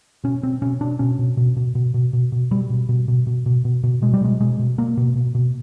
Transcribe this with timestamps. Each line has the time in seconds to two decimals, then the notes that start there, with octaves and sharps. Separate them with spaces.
0.24 B2 C#4
0.43 B2 C4
0.62 B2 C#4
0.81 B2 D4
0.99 B2 C#4
1.19 B2
1.37 B2
1.57 B2
1.75 B2
1.94 B2
2.13 B2
2.32 B2
2.51 B2 G3
2.70 B2
2.89 B2
3.08 B2
3.27 B2
3.46 B2
3.65 B2
3.84 B2
4.02 B2 G#3
4.14 G3
4.21 B2 G#3
4.40 B2 G#3
4.59 B2
4.78 B2 A#3
4.97 B2
5.16 B2
5.35 B2